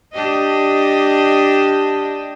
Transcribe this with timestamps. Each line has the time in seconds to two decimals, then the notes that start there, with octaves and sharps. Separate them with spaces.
0.13 D4 G4 D#5